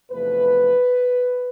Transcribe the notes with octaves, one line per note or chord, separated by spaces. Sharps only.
E2 C3 F3 A3 B4